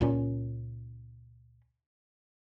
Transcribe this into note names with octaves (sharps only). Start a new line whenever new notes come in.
C#2 A#2 C#4